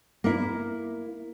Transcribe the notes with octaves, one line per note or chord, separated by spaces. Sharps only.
A#3 E4